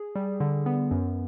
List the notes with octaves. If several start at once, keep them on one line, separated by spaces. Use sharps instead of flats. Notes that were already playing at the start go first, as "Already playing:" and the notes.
Already playing: G#4
G3
D3
B3
F#2